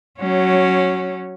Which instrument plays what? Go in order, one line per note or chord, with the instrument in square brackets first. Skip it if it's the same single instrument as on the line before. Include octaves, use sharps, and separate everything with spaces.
[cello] F#3 C#4